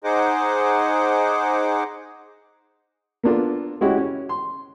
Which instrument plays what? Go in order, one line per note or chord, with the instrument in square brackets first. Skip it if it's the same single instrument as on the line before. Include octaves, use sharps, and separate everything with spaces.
[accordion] D#4 G#4 C5 D#5 F#5 D6
[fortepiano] A#3 B3 D4 F4 A4 A#4
G#3 C#4 E4 F#4 G4
C#4
C6